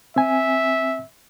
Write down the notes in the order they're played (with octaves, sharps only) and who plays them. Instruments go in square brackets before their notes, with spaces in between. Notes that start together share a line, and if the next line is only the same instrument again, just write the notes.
[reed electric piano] C4 G#5 [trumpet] E5